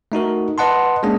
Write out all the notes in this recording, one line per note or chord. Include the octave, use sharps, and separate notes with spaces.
A3 D#4 F#4 A#4
B4 D#5 F#5 A5 C6
G#3 A#3 C#4 D4 G#4